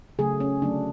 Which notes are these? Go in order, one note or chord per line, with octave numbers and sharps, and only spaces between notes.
C#3 F#3 A3 G#4
C#4
D3 F#3 A3 D4